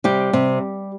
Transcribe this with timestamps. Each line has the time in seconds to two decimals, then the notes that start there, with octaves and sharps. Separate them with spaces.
0.04 C3 G3 G4
0.33 C3